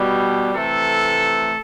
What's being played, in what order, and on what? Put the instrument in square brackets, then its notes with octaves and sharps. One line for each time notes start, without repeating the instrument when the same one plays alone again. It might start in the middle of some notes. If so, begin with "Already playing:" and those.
Already playing: [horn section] B2 G3
C3 E3 A3 A4